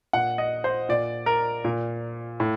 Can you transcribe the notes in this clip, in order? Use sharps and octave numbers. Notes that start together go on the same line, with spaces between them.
A#2 F#5
D#5
C5
A#2 D5
A#4
A#2
A2